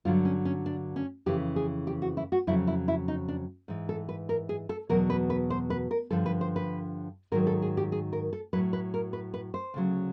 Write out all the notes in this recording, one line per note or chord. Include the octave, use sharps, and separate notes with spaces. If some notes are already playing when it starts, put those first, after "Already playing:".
G2 D3 F#3 F4
C#4
C#4
D4
C#4
F2 C#3 E3 G4
G#4
G4
F#4
E4
F#4
F2 C#3 F#3 E4
E4
E4
D#4
D4
G#2 E3
A4
B4
A#4
G#4
A4
E2 B2 F#3 A#4
B4
B4
C5
B4
A#4
G2 D3 F3 A4
B4
C5
B4
G#2 D#3 F#3 A#4
A4
G#4
G4
G#4
A#4
A4
A2 F#3 B4
B4
A#4
B4
B4
C5
D2 C#3 F#3